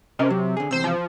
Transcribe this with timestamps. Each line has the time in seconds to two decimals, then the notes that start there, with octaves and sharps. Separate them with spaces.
0.19 C3 C#4 A#4 D#5
0.30 F#3
0.57 D3 G#4
0.71 E2 C3 C5 E6
0.84 F3